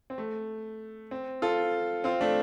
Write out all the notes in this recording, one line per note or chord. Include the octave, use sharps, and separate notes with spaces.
C4
A3
C4
F4 A4
C4 F4
A3 D4